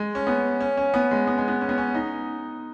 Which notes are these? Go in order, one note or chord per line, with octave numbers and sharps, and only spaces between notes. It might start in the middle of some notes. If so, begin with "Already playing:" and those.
Already playing: G#3
C#4
B3
C#4
C#4
B3
G#3
B3
G#3
B3
C#4
B3
C#4
D#4